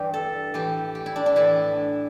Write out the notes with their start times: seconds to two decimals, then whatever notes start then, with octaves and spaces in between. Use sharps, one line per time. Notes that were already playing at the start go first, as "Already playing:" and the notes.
Already playing: G2 E3 G4
0.14 A4
0.54 A2 E3 G4
0.95 G4
1.06 E4
1.16 D4
1.26 D4
1.36 A2 E3 E4